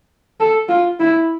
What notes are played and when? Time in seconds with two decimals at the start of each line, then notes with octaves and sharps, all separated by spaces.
0.40 A4
0.69 F4
1.00 E4